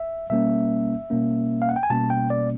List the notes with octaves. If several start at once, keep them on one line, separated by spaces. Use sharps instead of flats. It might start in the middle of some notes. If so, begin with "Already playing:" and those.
Already playing: E5
B2 G3 A#3 C#4 E5
B2 G3 A#3 C#4
F5
F#5
G5
G#5
B2 G3 A#3 C#4 A5
G5
D5